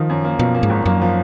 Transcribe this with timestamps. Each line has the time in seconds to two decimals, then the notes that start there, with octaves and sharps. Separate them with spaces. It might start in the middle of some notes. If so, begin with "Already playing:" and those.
Already playing: D#3 F3
0.10 F#2
0.25 A#3
0.39 B2 F3
0.54 A#3
0.63 G#2
0.70 G#1
0.86 F#2 A#3
1.01 F3